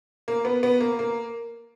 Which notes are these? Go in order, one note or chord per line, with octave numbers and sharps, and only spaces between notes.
A#3
B3
B3
A#3
A#3